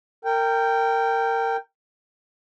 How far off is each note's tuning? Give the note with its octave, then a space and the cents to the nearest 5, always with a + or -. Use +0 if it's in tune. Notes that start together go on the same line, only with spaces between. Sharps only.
A#4 -25 G5 +0